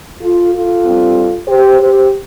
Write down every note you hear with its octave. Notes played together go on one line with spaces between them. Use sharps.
F4 A4
F4 A4
G2 G3 C4
G4 C5
G4 C5